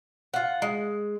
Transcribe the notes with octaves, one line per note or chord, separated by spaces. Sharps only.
F4 F#5
G#3